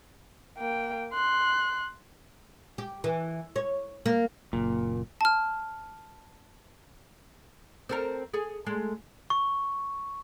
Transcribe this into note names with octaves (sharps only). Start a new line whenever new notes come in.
A#3 G5
C6 F#6
G4
E3
C#5
A#3
F#1 A#2
A5 F6
C4 A4 A#4
G#4 A4
G#3 A3
C#6